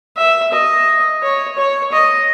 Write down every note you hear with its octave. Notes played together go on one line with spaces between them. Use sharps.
E5
D#5
C#5
C#5
D#5